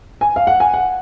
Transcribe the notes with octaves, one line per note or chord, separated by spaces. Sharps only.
G#5
F5
F#5
G#5
F#5